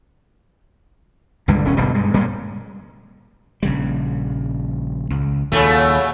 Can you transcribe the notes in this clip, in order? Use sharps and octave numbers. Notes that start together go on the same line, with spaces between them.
C#2 G2 D3 G#3
E1 C#4
F#1 B2 D3 G3
G2 G#3
A#2 G3 G#3
A#1 C#3 G3
C#2
D#2 A#2 C#3 F#3 A3